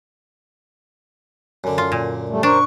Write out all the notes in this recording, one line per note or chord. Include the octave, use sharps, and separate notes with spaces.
F#2 D3
F4
A#2
G3 A3
D4 A#4 C5 C#6